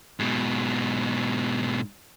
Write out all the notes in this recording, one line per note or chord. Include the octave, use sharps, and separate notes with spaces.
G#2 B2